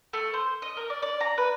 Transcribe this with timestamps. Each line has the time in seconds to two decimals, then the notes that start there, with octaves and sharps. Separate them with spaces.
0.13 A3
0.34 C5
0.62 D#5
0.77 A#4
0.90 D5
1.02 D5
1.20 A#5
1.38 B4